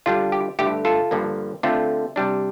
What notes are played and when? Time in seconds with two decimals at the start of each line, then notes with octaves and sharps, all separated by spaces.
0.06 D3 G3 D4 F4
0.32 G4
0.59 G2 D3 A3 G4
0.85 F4 A4
1.11 G2 D3 F3 A#3
1.63 D3 A3 C4 F4
2.16 C3 G3 D4